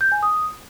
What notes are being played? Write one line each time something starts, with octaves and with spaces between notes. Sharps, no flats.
G6
G#5
D#6